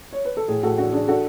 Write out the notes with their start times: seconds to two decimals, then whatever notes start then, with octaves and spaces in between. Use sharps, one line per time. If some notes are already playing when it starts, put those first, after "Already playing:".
0.13 C#5
0.25 B4
0.37 A4
0.48 A2 G#4
0.63 A2 F#4 A4
0.78 D4 F#4
0.92 D4 G#4
1.08 D4 F#4 A4